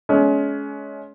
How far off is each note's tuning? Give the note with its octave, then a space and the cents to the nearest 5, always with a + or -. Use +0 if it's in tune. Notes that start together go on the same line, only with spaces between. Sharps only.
G#3 +35 C#4 +25